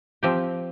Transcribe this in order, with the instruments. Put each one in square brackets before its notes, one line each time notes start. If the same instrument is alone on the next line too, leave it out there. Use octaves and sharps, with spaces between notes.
[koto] F3 C4 G4